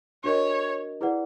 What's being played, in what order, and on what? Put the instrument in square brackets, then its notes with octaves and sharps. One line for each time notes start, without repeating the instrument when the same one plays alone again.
[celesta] D4 F#4 A#4 D#5 [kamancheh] C#5
[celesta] E4 G#4 B4 D5 F#5